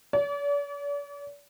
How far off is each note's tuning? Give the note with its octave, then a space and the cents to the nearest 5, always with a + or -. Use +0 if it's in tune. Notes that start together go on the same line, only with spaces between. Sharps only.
D5 -45